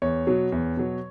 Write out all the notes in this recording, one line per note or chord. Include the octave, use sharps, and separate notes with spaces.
E2 C#5
B2 F#3
E2
B2 F#3